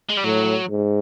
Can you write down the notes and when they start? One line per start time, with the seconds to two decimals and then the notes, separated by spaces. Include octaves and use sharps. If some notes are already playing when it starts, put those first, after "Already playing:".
0.10 G#3
0.17 G3
0.24 A2 F#3
0.70 G#2